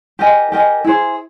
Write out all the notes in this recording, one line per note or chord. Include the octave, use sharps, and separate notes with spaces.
G4 A#4 D#5 G#5
G4 A#4 D#5 G#5
E4 G#4 C5